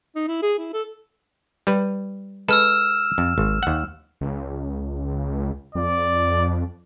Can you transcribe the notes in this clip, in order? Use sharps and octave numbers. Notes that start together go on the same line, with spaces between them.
D#4
E4
G#4
E4
A4
G3 B4
G#3 A4 B4 E6 F6 E7
F2
G#1
D#2 F#5
C#2
F2 D5